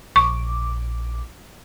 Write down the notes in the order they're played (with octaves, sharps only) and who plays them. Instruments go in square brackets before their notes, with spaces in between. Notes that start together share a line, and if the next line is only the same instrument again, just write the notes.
[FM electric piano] A#1 D6 [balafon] C#6